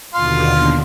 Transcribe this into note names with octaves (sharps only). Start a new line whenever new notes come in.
D#2 B2 D3 F4 F5 C6